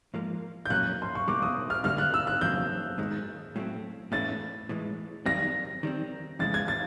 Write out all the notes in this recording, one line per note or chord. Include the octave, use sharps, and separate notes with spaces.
G#2 F3 A#3
G6
A#2 F#3 A#3 C#4 F#6
C6
C#6
B2 G3 A#3 D6
D#6
F6
D3 G3 A#3 F6
F#6
E6
F#6
E2 C#3 F#3 A#3 G6
G#2 D#3 G#3
A2 F#3 A3 C4
A2 E3 A3 C#4 E4 A6
A2 E3 G#3
F#2 D#3 G3 C4 A#6
D#3 G3 C4
F2 C#3 E3 G#3 A6
G#6
A6